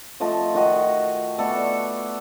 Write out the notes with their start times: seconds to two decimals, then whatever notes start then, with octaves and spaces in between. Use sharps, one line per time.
0.20 F3 A3 D#5 A5
0.54 D#3 F#4 D#5
1.38 A3 B3 A4 D5